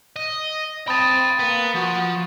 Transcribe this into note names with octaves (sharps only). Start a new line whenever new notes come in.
D#5
C4 G5 A5 B5 D#6 A6
A#3 B3
F3 F#4